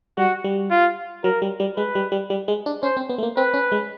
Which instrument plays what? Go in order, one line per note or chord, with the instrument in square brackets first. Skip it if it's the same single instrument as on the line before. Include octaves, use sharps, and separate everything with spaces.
[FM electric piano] G3 [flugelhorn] F#4
[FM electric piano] G3
[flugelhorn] F4
[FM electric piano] F#3 [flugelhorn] A#4
[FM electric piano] G3
G3
[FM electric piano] G#3 [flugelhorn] B4
[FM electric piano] G3
G3
G3
G#3
D4
[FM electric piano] C#4 [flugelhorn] C5
[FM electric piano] C4
B3
A3
A#3
[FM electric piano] C4 [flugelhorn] B4
[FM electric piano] C#4
G#3